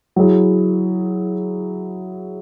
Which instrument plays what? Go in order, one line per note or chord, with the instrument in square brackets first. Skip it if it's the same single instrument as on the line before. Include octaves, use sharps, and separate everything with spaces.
[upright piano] F#3 E4 G#4